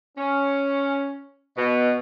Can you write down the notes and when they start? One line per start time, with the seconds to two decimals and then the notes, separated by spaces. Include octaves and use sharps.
0.18 C#4
1.57 B2